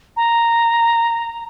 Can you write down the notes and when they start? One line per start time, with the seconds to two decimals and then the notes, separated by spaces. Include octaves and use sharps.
0.16 A#5